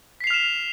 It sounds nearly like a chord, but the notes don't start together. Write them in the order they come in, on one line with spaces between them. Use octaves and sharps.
B6 C7 F7 F6 E7